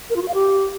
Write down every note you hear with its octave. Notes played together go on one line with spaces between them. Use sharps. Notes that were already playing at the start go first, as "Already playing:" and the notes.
A#4
F4
F#4
F5
G4